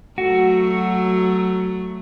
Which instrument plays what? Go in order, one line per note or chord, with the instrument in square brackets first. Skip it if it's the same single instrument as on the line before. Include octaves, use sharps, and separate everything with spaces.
[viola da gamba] F#3 A3 [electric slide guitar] F#4